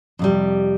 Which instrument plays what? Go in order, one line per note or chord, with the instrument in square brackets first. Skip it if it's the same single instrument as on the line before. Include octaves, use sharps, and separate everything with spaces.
[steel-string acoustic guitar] F2 C3 G3